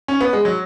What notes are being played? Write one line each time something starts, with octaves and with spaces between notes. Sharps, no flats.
C#4
B3
G#3
F#3